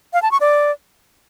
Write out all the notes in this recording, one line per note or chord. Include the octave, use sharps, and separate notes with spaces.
F5
A5
C#6
D5